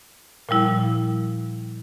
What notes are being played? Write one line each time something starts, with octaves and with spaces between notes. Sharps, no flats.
A#2 F3 G3 E4